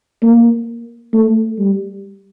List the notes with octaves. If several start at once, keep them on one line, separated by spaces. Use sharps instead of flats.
A#3
A3
G3